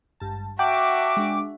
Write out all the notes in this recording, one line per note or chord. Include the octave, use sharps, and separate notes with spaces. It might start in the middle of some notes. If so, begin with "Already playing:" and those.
G#1 G2 A5
F#4 E5 F#5 G5 A5 D6
G#3 D4